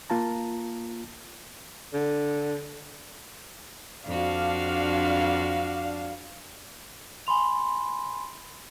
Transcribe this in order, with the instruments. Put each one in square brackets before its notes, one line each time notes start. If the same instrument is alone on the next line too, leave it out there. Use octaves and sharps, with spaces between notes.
[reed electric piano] A#3 F4 A5 A#5
[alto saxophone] D3
[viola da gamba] F2 F#4 [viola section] D4 F5
[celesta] G#5 B5 C6 F7